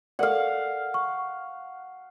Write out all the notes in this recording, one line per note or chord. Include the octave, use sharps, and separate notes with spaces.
A4 A#4 D5 F5 F#5
C#6